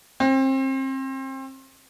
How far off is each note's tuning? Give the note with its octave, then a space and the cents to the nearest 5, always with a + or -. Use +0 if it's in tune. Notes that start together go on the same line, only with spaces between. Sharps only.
C4 +30